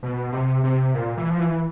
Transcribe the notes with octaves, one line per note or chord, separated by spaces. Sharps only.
B2
C3
C3
A#2
E3
F3
E3